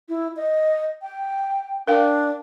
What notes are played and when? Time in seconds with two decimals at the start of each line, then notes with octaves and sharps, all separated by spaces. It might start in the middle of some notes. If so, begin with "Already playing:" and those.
0.09 E4
0.36 D#5
1.02 G5
1.87 D4 A#4 F5 G5